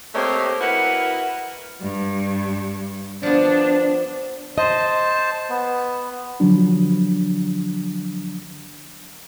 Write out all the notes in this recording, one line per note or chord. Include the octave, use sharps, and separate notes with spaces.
A3 A#3 C4 G4 C#5 D#5
E4 F#4 A#4 B4 F#5
G2
F3 B3 D4
C5 D#5 A5
B3
D3 F3 F#3 D4